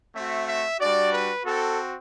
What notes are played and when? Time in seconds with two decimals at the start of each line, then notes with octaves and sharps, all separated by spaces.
0.14 A3 C4 F#4 E5
0.47 E5
0.80 G3 D4 F#4 D5
1.12 B4
1.44 C4 F#4 A4